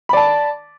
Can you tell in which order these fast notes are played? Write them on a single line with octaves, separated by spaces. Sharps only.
B5 D5 A5